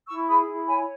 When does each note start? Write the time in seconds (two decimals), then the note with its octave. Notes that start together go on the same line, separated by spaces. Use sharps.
0.09 E4 C#6 E6
0.28 G#4 B5 D#6
0.48 E4
0.68 C#5 G#5 B5